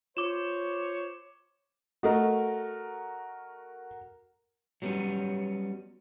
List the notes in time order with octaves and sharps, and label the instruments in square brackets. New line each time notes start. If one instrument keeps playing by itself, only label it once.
[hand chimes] F4 [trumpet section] C5 C#5 [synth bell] D6 E7
[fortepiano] A3 D#5 [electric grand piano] F#4 A#4
[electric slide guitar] F#3 G3 B3 C#4